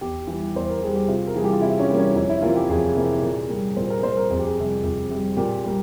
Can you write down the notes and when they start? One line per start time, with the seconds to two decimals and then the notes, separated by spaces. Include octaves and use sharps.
0.01 E2 G4
0.27 E3 G3
0.55 E2 C5
0.69 A#4
0.82 E3 G3 G#4
0.95 G4
1.08 C3 F4
1.27 A#4
1.35 E3 G3 A#3 G#4
1.44 G4
1.53 F4
1.61 C3 E4
1.79 C#4
1.89 E3 G3 A#3
1.98 C#4
2.15 F2 C#4
2.29 E4
2.42 C3 E3 A#3 F4
2.55 G4
2.70 F2 G#4
2.96 C3 E3 A#3
3.22 A#2
3.49 G3 A#3
3.77 A#2 C5
3.90 A#4
4.02 G3 A#3 C5
4.17 A#4
4.30 F2 G#4
4.39 G4
4.46 G#4
4.57 C3 G3
4.84 F2
5.10 C3 G3
5.37 A#2 G4
5.64 G3 A#3